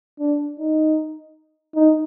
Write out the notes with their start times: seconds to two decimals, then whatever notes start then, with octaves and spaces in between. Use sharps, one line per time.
0.20 D4
0.59 D#4
1.75 D#4